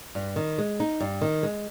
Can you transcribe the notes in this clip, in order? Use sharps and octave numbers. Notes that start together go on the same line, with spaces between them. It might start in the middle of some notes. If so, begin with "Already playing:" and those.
G2
D#3
G#3
D#4
G2
D#3
G#3